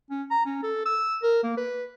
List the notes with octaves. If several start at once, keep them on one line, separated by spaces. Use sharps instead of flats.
C#4
A#5
C#4
A4
E6
A#4
A#3
B4